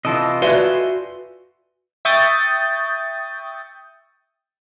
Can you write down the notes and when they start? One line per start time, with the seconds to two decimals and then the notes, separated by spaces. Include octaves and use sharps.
0.05 C3 E3 F4 A4 D#5
0.42 F#4 B4 D5 E5 G#5 C6
2.05 E5 G5 C#6 D#6 G6 A6